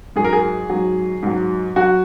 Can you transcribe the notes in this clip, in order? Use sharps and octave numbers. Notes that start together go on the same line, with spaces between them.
G#2 F#3 G#4
A#4
G#4
G#2 F#3
G#2 F#3
F#3 F#4